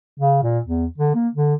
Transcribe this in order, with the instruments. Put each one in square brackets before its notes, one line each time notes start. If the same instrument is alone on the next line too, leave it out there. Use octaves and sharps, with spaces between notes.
[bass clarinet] C#3
A#2
E2
D3
A#3
D3